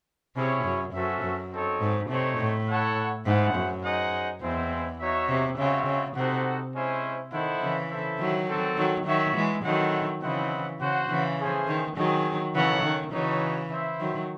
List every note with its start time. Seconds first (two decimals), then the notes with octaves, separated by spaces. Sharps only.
0.36 C3 C#4 E4 G#4 C#5
0.65 F#2
0.93 F#2 C#4 F#4 A4 C5 E5
1.22 F#2
1.52 C4 D#4 A4 C#5
1.80 G#2
2.09 C3 A3 C4 D#4 A4 C#5
2.38 A2
2.68 E4 A4 C#5 F#5
3.26 G#2 E4 G#4 C5 F#5
3.54 F#2
3.84 D#4 G#4 C5 D#5 F#5
4.41 E2 G#3 C4 E4 C5
5.00 D#4 F#4 C#5 E5
5.29 C3
5.58 C#3 G#3 C4 F#4 C#5 E5
5.87 C#3
6.16 C3 D#4 F#4 A4 C5 F#5
6.74 G#3 C#4 E4 C5
7.32 D#3 E4 A4 C5 D#5 F#5
7.61 C#3 E3
7.90 E4 A4 C5 E5
8.19 D#3 F#3
8.48 C4 F#4 A4
8.77 D#3 F#3
9.06 D#3 F#3 F#4 C#5 E5
9.35 E3 G#3
9.64 D#3 F#3 C4 E4 A4 D#5 F#5
10.22 C#3 E3 C4 E4 C5 D#5 F#5
10.80 C#3 F#4 C5 F#5
11.10 C#3 E3
11.38 A3 C#4 G#4 C5
11.68 D#3
11.97 D#3 F#3 C4 D#4 G#4
12.54 C#3 E3 D#4 A4 C#5 F#5
12.83 D#3
13.12 C#3 E3 D#4 F#4 C#5
13.71 E4 C5 E5
13.99 D#3 F#3